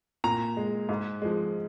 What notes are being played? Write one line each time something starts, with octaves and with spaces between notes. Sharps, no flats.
A#2 A#5
G#3
G#2
F3 G#3